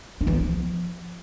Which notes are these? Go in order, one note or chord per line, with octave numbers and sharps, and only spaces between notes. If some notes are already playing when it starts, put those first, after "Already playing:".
D4
E3
B3
F3